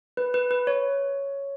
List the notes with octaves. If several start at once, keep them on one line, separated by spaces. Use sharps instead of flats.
B4
B4
B4
C#5